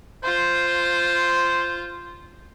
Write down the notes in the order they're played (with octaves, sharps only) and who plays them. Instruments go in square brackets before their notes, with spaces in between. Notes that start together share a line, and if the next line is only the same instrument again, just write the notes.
[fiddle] F4 [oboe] C5